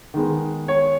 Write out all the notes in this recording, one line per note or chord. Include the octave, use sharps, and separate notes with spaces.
D#3 G#3 B3
C#5